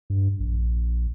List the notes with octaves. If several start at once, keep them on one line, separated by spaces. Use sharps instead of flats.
G2
A#1